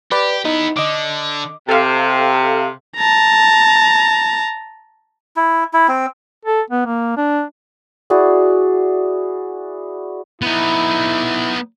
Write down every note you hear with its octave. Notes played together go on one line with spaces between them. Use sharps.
G4 B4 D5
B3 D#4 E4
D3 D#5 D6
C3 A4 F5
A5 A#5
E4
E4
C4
A4
B3
A#3
D4
E4 F#4 G#4 D5
B3 D#4 E4